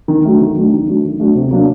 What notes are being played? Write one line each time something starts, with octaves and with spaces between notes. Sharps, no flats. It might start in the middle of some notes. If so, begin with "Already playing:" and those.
D#3
F#3 A3 D4 F#4
D#3
F#3 A3 D4 F#4
D#3
F#3 A3 D4 F#4
D#3
F#3 A3 D4 F#4
C3
F#3 A#3 D4